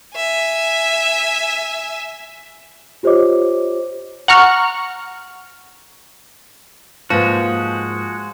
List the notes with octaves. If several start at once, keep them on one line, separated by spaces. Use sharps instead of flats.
E5 G#5
F4 G4 C5 C#5 D#5 D6
F#5 A#5 C#6 F6
G#2 F3 G#3 A#3 F#4 B4